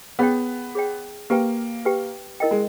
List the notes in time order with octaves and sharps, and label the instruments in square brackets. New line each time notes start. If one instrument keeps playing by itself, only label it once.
[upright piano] B3 [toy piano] G#4 C#5 G5
[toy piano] G#4 C#5 G5
[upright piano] A#3 [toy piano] G4 B4 G5
[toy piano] G4 B4 G5
E4 A#4 D#5 G5
[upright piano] G#3